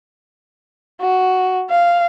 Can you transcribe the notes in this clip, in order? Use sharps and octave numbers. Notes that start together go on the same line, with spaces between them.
F#4
F5